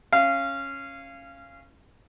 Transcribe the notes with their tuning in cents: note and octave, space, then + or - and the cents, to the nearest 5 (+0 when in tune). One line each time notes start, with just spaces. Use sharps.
C#4 -15 F5 -20